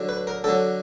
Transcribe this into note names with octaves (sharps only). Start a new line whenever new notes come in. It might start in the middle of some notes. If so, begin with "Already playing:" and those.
Already playing: D3 F#3
B4
A#4
D3 F#3 A4